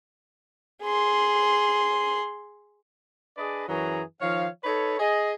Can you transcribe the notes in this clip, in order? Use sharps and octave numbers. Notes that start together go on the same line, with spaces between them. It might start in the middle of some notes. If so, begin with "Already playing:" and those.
G#4 C6
D4 G#4 B4 D5 D#5
F#2 E3 F#3 F#4 G#4 A#5
D#3 F3 C#5 F5
D#4 A4 B4 C#5
G#4 D#5